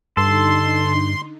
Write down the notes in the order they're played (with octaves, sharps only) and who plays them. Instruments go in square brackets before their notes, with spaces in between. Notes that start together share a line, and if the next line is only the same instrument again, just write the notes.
[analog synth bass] G2 [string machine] D3 D#4 [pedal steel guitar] A4 [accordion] C6